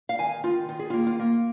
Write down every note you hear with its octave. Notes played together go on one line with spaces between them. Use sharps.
F5
D#3 G#5
D#3 F4
D#3 F4
G#4
F4
A#3
F4
A#3